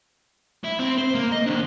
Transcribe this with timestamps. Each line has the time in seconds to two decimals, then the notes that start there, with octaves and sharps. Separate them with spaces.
0.64 E4
0.79 C4
0.98 C5
1.15 A#3
1.32 D#5
1.47 D#3 D4